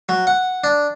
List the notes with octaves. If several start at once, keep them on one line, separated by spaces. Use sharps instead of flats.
F#3
F#5
D4